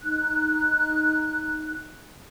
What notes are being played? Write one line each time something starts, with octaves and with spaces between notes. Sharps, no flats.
D#4 F#6